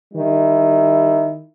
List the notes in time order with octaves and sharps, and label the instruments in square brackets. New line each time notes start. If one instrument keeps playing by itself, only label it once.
[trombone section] D#3 G3 E4